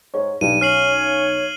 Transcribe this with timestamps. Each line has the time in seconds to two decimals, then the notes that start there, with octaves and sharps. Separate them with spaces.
0.14 G#2 C#5
0.41 B1 G2 D#7
0.61 C#4 F6 C7 F#7
0.85 C#5